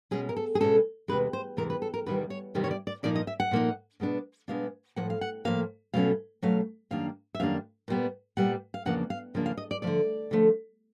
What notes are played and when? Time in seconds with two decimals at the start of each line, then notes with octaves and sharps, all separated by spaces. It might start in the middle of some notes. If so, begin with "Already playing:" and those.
0.11 B2 G#3 C#4 G#4
0.29 A#4
0.37 A4
0.55 G#4
0.60 B2 G#3 C#4 A4
1.08 E2 C3 E3 G#3 B4
1.33 C5
1.57 E2 C3 E3 G#3 A#4
1.70 B4
1.82 A4
1.94 A#4
2.06 E2 C3 D#3 G3 B4
2.30 C#5
2.55 E2 C3 D#3 G3
2.64 C#5
2.71 D5
2.87 D5
3.03 A#2 F3 A#3 D#4 D5
3.16 D#5
3.27 E5
3.40 F#5
3.51 A#2 F3 A#3 D#4
4.00 B2 G#3 B3 D4
4.48 B2 G#3 B3 D4 F5
4.96 A2 F3 A#3 F#5
5.10 F5
5.21 F#5
5.45 A2 F3 A#3 F5
5.94 B2 F#3 A3 C#4 F5
6.42 B2 F#3 A3 C#4 F5
6.91 F#2 D#3 G3 A#3 D4 F5
7.35 E5
7.40 F#2 D#3 G3 A#3 D4 F5
7.88 A#2 G3 B3
8.37 A#2 G3 B3 F#5
8.74 F5
8.86 E2 C#3 F3 A#3 D4 F#5
9.10 F5
9.34 E2 C#3 F3 A#3 D4
9.46 F5
9.57 D#5
9.71 D5
9.82 D3 F3 A3 D5
10.31 D3 F3 A3